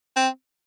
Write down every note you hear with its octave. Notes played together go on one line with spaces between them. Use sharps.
C4